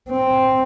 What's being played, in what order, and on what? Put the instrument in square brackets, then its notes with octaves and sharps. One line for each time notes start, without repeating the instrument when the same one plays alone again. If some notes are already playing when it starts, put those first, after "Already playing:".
[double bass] C4